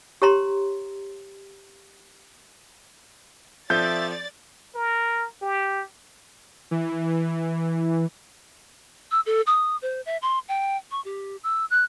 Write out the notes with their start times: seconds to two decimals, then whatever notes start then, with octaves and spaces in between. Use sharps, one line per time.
0.22 G4 C#5 A#5 C6
3.70 F3 C4 A4 D5 E5 G6 A6
4.75 A#4
5.42 G4
6.71 E3
9.11 E6
9.26 A4
9.47 D#6
9.82 C5
10.06 E5
10.22 C6
10.49 G5
10.91 C#6
11.05 G4
11.44 E6
11.70 F#6